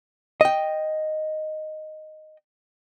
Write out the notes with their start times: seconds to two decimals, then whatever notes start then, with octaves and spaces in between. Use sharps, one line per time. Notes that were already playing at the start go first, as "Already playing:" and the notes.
0.41 D#5 G5